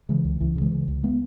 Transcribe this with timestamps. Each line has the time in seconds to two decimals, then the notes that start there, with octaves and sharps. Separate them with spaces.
0.09 C#3 E3 G#3
0.25 C#2
0.40 C#2 E3
0.56 C#3
0.61 E3 G#3
0.71 C#3
0.88 C#2
1.03 G#3 B3